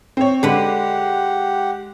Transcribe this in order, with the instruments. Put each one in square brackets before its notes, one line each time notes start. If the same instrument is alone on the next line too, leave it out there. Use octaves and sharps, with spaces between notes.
[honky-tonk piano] C4 C#5
[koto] D3 B4 [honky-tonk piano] G#3 [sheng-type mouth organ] G4 F#5